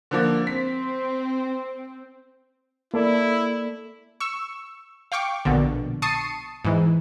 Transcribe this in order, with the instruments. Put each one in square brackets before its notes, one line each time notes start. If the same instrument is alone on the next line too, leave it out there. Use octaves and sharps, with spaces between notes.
[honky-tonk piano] D3 F3 A#3
[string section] C4 [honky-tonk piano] B6
[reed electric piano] A#3 A4 D5 [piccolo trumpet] E4
[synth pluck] C#6 E6
F5 G5 C#6 D6
A#1 B2 D3
A5 C#6 D#6 C7 C#7 D#7
G#2 E3